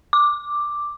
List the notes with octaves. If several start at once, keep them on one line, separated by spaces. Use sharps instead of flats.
D6